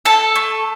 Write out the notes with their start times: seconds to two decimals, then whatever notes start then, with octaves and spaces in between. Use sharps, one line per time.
0.05 A4 A5
0.36 A3